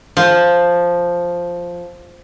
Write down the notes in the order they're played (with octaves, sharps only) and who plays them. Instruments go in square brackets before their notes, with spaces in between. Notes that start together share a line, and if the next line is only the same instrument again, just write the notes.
[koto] F3